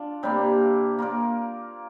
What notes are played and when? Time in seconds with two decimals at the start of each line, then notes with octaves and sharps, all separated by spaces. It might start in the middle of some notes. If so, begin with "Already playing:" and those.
Already playing: D4 F4
0.23 C3 G3 A#3
0.99 A#3 F4 A#4 D5